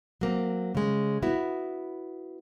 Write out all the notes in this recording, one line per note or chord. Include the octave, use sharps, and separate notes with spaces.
F#3 A#3 C4
C#3 G#3
B3 E4 F#4